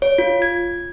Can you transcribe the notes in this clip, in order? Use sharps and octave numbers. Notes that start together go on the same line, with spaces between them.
C#5
F4
G#6